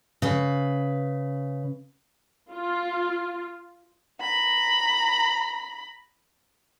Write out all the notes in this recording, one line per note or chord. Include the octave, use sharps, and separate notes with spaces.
C#3 B4
F4
A#5 B5